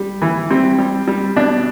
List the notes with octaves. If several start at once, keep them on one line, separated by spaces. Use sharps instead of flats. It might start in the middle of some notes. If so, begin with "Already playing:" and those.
Already playing: G3
E3
G3 C4
G3
G3
B2 D4